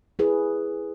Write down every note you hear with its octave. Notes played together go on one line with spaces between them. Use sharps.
E4 G#4 B4